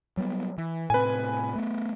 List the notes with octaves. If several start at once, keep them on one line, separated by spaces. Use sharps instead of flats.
F#3 G3 B3
E3
A2 C3 C4 B4 G#5
A3 B3